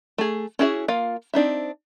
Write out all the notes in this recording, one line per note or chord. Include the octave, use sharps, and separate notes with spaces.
A3 G#4
C#4 E4 F#4 G#4 E5
A#3 F4 F5
C4 D4 D#4 E5